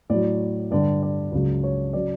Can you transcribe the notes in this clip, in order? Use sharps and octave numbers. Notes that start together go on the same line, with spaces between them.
A2 F#3 D5
G2 D3 G3 D5
D5
C#2 C#3 F#3
C#5
C#3 F#3 D5